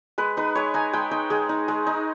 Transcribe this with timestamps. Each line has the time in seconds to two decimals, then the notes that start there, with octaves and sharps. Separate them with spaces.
0.18 G#3 B4
0.37 D#4 B4
0.55 G#3 C#5
0.74 D#4 G#5
0.93 G#3 G5
1.11 D#4 G5
1.30 G#3 G#4
1.49 D#4
1.68 G#3
1.87 D#4